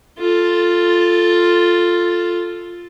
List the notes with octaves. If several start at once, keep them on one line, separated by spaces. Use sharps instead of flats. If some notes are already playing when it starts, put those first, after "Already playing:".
F4 A4